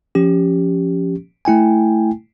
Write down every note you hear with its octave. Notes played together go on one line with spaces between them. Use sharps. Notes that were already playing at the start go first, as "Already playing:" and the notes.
F3 C#4 G4
A3 E4 G5 G#5